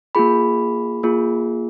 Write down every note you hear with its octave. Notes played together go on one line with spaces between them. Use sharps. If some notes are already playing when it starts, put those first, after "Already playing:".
A#3 F4 G#4 B5
A#3 F4 G#4